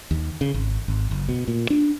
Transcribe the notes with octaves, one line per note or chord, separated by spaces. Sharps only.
D#2
C#3
G#1
G#1
F#1
B2
A#2
D4